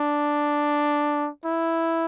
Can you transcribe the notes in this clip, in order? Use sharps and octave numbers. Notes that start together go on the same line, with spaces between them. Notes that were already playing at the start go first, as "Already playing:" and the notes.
Already playing: D4
E4